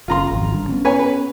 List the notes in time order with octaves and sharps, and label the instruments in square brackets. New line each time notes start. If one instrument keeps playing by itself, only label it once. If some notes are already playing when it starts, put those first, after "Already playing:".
[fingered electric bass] F#1 C#3 [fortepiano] F4 A#5 C6
[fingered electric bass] G#1 F2
G2 D3
B3 C#4
[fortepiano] B4 C#5 G#5
B4